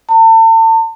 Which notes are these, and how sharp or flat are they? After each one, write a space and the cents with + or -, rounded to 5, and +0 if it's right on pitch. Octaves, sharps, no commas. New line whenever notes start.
A5 +40